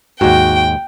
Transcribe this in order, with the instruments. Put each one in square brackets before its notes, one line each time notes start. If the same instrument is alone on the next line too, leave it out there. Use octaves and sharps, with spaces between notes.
[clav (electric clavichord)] D#2 G#2 [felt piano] F#4 [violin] G5